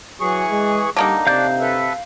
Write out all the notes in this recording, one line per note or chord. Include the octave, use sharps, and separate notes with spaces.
E3 F#3 G#4 C#6
G#3
D3 G3 A#3 D#4
C3 D4 D5 F5 G6
A4 B4 E5